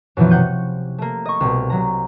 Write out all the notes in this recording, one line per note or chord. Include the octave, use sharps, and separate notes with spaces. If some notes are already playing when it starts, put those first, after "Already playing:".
F#2 B2 E3 F3
C3 F#5 G6 C#7 D#7
A3 A#3
D#5 C#6
C2 B2
C2 F#3 A#5